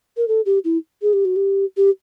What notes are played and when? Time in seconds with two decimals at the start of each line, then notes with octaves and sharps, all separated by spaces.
0.17 A#4
0.28 A4
0.46 G4
0.65 E4
1.02 G#4
1.13 G4
1.25 F#4
1.36 G4
1.77 G4